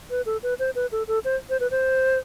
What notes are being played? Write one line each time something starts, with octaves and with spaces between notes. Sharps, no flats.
B4
A4
B4
C5
B4
A4
A4
C5
C5
B4
C5